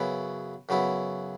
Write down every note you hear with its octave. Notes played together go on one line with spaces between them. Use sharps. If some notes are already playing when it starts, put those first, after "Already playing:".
Already playing: F#2 C#3 F#3 B3 E4
F#2 C#3 F#3 B3 E4